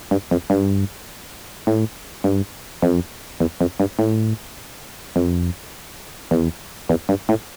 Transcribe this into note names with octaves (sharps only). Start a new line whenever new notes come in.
G2
F2
G2
A2
G2
F2
E2
F2
G2
A2
F2
E2
E2
G2
A2